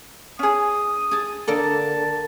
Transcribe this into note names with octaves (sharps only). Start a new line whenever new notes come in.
C#4 G#4 D#6
G#4 A5
D3 A#3 A4 D5 A5